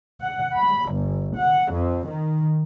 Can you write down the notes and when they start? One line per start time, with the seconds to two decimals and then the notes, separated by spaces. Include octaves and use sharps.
0.22 F#5
0.57 B5
0.93 G1
1.39 F#5
1.72 F2
2.08 D#3